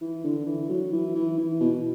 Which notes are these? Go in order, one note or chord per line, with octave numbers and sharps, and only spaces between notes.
E3
D3
E3
F#3
E3
E3
E3
B2